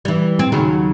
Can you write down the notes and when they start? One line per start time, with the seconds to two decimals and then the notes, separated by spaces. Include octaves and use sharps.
0.05 E3 G3
0.39 C4
0.52 D#2 C#3 F#3